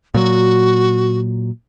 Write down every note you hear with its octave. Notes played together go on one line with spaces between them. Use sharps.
A#2 F#3 F#4